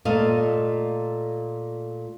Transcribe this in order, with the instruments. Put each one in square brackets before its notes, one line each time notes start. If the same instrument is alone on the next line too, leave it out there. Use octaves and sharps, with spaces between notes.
[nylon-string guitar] A#2 A3 D#5 F5